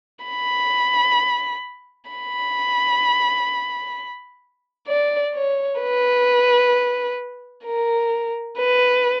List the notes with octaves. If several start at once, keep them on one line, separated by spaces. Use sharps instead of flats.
B5
B5
D5
C#5
B4
A#4
B4